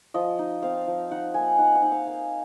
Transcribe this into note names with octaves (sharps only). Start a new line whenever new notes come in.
F3 D#5
D#4
C4 F5
F3
D#4 F#5
A#3 G#5
D#4 F#5
F#5
D#4
F5
A#3